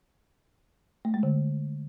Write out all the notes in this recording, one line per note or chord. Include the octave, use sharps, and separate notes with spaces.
A3
G#3
D3